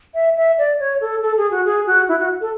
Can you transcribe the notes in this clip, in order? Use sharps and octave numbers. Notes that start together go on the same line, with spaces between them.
E5
E5
D5
C#5
A4
A4
G#4
F#4
G#4
F#4
E4
F#4
A4